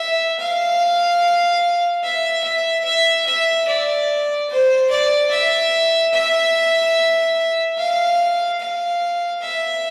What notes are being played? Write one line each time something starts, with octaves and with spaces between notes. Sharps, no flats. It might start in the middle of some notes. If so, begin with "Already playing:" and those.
Already playing: E5
F5
E5
E5
E5
E5
D5
C5
D5
E5
E5
F5
F5
E5